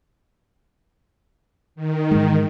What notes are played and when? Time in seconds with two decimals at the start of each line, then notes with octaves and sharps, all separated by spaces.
1.75 D#3
2.11 G#2 E3 G#3